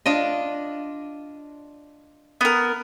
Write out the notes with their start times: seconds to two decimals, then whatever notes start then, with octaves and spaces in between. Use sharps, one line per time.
0.06 D4 F4 D#5
2.41 B3 A#4